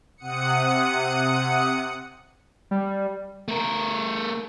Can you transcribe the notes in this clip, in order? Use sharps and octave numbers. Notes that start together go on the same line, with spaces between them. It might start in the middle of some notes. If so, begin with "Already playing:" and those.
C3 F#5 D#6 C#7
G3
A3 A#4